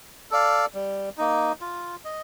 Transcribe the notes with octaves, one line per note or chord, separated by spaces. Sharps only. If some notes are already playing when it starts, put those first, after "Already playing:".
A4 D5 F5
G3
A#3 D#4
F4
D#5